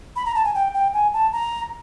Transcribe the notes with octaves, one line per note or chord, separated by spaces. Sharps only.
B5
A#5
A5
G#5
G5
G5
G#5
A5
A#5